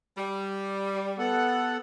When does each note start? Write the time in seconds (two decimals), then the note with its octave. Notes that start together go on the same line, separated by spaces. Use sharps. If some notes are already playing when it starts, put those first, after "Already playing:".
0.17 G3
1.19 B3 A4 F#5